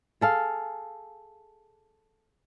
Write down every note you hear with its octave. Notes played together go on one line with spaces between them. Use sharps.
G#4 A4 F5